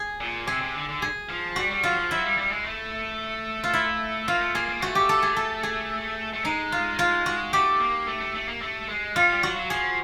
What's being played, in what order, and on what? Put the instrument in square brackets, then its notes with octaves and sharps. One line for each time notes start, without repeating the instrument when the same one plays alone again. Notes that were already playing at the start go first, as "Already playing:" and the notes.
Already playing: [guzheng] G#4
[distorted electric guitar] A#2
[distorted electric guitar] C3 [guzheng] G#4
[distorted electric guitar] C3
D3
D3
[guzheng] G#4
[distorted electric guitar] F3
[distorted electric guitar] G3 [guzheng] F#4
[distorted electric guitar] G3
[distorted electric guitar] F#3 [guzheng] F4
[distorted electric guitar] F3
[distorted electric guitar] F#3 [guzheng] E4
[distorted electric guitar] G3
G3
G#3
A3
[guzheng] F4
E4
[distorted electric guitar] A#3 [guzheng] F4
[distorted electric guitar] A3
[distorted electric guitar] A#3 [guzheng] G#4
[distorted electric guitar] A#3
[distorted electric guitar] A3 [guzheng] F#4
[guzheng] G4
A4
G#4
A4
G#4
[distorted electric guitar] A3
[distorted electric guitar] G#3 [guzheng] D#4
[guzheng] F4
F4
F#4
[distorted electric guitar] A3 [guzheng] G4
[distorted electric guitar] A#3
A3
A3
A3
A#3
A3
G#3
[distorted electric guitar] G3 [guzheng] F4
[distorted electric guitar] G3
[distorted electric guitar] F#3 [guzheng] F#4
[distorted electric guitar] F#3
[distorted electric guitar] F3 [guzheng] G#4